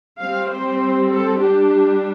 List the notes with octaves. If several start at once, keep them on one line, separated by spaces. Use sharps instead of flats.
G3 C4 F5
C5
A4
G3 D4 G4